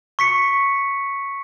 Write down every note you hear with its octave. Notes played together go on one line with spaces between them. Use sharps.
C#6 B6 C#7